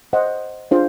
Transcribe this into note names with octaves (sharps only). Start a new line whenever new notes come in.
C5 D#5 F#5
D4 F4 G#4 C5 F5